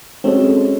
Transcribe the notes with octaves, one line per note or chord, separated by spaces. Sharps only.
G#3 C4 C#4 F#4 A4 C#5